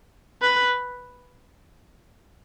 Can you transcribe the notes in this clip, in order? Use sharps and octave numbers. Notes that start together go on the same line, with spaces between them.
B4